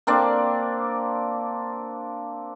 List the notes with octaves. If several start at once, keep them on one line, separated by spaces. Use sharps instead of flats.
A#3 C4 D4 D5